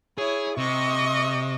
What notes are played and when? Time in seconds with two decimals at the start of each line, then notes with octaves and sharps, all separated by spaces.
0.18 E4 G#4 C#5
0.57 C3 D#5 C#6